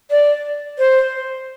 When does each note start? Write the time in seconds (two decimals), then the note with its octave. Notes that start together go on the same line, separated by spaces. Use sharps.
0.11 D5
0.78 C5